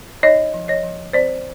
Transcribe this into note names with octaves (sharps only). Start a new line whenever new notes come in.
D#4 C#5 D#5
F3
C#5 D#5
F3
C4 C5 D5